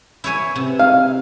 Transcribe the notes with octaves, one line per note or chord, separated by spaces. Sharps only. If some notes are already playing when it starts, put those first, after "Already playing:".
E4 C#5 G#5
C3
F5